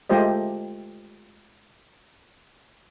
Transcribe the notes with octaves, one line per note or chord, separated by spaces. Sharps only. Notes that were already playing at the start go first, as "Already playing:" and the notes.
G#3 A3 F4 G4 C5 D#5